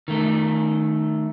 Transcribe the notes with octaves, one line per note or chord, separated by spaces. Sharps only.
D#3 A3